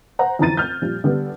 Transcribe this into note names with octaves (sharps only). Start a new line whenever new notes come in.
C5 F#5 A#5
F2 D3 E3 A#5 A6 D#7
F6 G6
A#2 F3 G3
D3 G3 B3